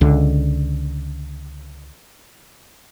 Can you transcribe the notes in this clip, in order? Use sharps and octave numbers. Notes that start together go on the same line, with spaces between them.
C#2 D3